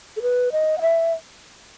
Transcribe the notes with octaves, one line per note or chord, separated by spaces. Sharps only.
A4
B4
D#5
F#5
E5